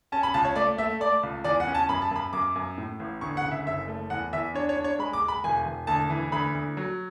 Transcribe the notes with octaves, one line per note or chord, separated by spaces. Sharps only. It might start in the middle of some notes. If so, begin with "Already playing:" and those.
C#4 A5
B5
C#2 A5
C#5
A3 D5
A3 E5
A3 D5
C#2
E2 D5
F#5
C#4
A5
F#2 B5
A5
F#2 B5
F#2 D6
F#2
A2
A1
D2 C#6
F#5
C#3
E5
F#1 E5
A3
E2 F#5
E2 E5
D4 C#5
C#5
D4
C#5
G#3 B5
D6
G#3
B5
E1 G#5
E1
D2 A5
E3
D2 B5
D2
F#3